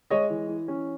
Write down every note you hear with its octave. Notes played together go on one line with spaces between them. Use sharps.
G#3 C#5 D#5
E3
E3
C#4